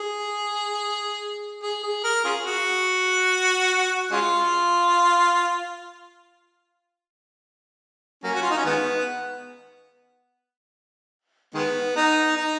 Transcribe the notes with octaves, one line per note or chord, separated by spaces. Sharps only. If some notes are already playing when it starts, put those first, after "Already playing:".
Already playing: G#4
G#4
G#4
A#4
C#4 F4 G#4
F#4
G#3 C#4 F4
F#3 A#3 C#4
F#4
F4
D#4
C#4
D#3 G#3 B3
D#3 G#3 B3
D#4
D#4